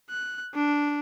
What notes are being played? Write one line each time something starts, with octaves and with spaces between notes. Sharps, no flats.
F#6
D4